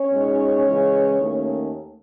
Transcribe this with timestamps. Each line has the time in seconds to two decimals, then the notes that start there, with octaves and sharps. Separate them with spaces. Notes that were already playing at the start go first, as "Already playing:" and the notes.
Already playing: C#4 C#5
0.11 B2 G#3 D#4
0.65 C#3 E3 G#3
1.21 D#2 D#3 A3 C#4